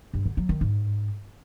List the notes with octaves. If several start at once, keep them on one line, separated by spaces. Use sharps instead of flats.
G2
D3
F#3
D#3
G#2